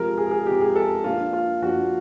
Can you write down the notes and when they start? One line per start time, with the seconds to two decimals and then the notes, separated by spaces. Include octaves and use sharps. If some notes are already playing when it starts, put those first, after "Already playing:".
Already playing: C3 F3 G#3 A#4
0.18 G#4
0.31 G#4
0.46 C3 F3 G#3 G4
0.61 G#4
0.76 A4
1.04 F3 A#3 D4 F4
1.33 F4
1.62 F3 A#3 D4 F#4